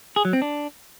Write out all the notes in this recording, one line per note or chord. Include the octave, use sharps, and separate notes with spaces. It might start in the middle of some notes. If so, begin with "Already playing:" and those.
G#4
F#3
C4
D4